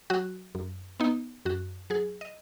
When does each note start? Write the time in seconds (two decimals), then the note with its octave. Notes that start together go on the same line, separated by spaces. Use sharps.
0.10 F#3 F#4
0.55 F#2
1.00 B3 D#4
1.45 F#2 F#4
1.90 F#3 G#4
2.21 D#5